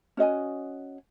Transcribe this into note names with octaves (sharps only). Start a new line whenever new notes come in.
C#4 F#4 D#5 G#5